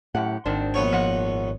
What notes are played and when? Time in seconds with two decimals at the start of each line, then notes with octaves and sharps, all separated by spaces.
0.15 F#2 A2 G4 F#5
0.46 G#1 D#3 C4 D4
0.74 A#1 B3 C#5
0.92 F3 D#5 F#5